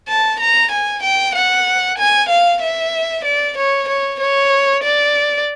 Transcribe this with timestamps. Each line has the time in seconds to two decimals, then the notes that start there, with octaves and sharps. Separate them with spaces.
0.08 A5
0.40 A#5
0.72 G#5
1.03 G5
1.35 F#5
1.98 G#5
2.29 F5
2.62 E5
3.25 D5
3.57 C#5
3.89 C#5
4.20 C#5
4.84 D5